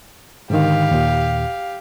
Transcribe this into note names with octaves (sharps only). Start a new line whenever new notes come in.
G#2 D3 D#3 G4 F5
D#2 A#2